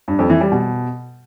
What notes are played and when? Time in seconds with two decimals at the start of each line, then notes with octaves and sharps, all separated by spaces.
0.08 G2
0.19 F2
0.30 E3
0.41 G3
0.52 B2